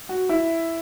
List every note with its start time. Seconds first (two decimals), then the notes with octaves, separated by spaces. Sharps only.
0.09 F#4
0.29 E4